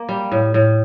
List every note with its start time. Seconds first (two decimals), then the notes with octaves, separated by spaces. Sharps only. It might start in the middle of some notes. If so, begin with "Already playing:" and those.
Already playing: A#3
0.09 G3
0.31 A2
0.54 A2